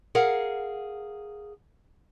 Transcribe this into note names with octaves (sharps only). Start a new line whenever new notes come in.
G#4 A#4 F5 F#5